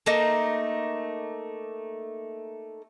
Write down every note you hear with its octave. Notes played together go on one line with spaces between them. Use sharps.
A3 A#3 D#4